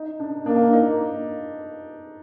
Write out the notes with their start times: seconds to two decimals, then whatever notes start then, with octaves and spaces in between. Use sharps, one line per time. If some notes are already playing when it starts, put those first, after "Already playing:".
Already playing: D#4
0.20 D4
0.46 A#3 D4
0.73 D#4